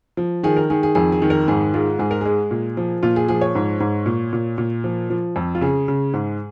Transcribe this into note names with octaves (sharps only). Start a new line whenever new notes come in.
F3
D#3 G#4
A#4
D#3 G#4
G#4
F2 G#4
G#4
D#3
A#4
G#2 G#4
G#3 F4
G#2 G#4
A#4
G#3 G#4
A#2
F3
A#2 F4
G#4
F3 G#4
C#5
G#2
G#2
A#2
A#2
A#2
F3
F3
F2
F4
C#3 G#4
C#3
G#2